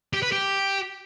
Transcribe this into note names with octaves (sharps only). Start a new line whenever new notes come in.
G4
B4
G4